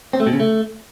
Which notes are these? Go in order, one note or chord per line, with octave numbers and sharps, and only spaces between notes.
C4
A3
B2
C#3
A3